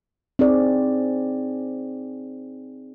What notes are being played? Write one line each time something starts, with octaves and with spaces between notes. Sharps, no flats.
C4 D#4 G#4 D5